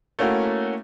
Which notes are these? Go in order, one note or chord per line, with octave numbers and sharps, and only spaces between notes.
A3 A#3 C#4 E4 F#4